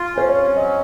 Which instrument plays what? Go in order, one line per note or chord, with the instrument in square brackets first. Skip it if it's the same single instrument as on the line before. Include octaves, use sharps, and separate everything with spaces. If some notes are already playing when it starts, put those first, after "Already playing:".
Already playing: [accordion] F4
[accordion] C#4 [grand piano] C5
[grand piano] C#5
[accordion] F#3 [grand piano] D#5